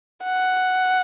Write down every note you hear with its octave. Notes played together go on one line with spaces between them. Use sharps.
F#5